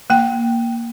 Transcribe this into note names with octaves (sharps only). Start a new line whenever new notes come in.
A#3 G5